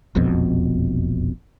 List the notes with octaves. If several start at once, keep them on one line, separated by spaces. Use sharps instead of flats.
E1 A#1 F2 B2